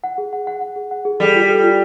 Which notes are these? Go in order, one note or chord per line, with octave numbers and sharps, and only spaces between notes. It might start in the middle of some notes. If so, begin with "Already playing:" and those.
F#5
G#4
F#5
F#5
F#5
G#4
F#5
G#4
G3 A4
F4
A4
F4